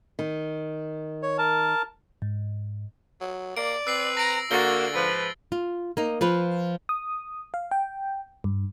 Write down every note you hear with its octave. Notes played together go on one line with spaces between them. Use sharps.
D#3
C#5
A#4 A5
G#2
F#3
A#3 D5 D7
C4 B4 E6 C7 F#7
A#5 A#6 D7
D3 A#3 F#4 A6 G7
G#2 F3 B4
F4
A#3 D#4
F3 F4 B4
D#6
F5
G5
G2